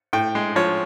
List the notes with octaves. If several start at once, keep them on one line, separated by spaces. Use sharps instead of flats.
A2 G5
G#3
F3 C#5